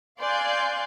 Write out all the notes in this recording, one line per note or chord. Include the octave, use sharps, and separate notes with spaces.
D5 F5 G#5 C6 F#6 G6